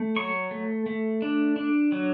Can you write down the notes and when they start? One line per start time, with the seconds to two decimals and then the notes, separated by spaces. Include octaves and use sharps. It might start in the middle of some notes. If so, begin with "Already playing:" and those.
Already playing: A3
0.16 F#3 C#6
0.51 A3
0.86 A3
1.22 D4
1.56 D4
1.92 F#3